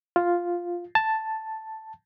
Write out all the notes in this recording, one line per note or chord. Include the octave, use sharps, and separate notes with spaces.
F4
A5